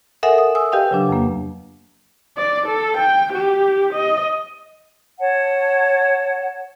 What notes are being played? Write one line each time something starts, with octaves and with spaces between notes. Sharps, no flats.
A4 A#4 E5 F#5 G#5 D#6
D#6
G#5 D#6 E6
G4 B4 D#5 F5 G5
C#3 F#3 D4
F2 A#3
D5
A4
G5
G4
D#5
C#5 F#5 A5